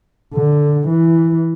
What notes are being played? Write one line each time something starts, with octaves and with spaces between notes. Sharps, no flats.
D3
E3